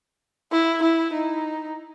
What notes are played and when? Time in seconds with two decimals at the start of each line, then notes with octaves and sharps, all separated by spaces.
0.52 E4
0.83 E4
1.13 D#4